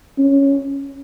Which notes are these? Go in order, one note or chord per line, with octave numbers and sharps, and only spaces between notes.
C#4